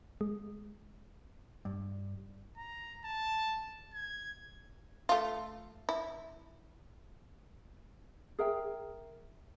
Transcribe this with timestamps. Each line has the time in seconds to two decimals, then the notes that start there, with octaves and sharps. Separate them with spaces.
0.21 G#3
1.65 G2
2.57 A#5
3.05 A5
3.94 G#6
5.09 A3 F4
5.89 E4
8.39 G#4 A#4 E5 G5